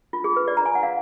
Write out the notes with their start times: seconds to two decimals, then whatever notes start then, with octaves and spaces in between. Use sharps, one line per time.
0.13 F4
0.24 G#4
0.36 B4
0.48 D5
0.57 A#5
0.66 G#5
0.75 F#5
0.83 F5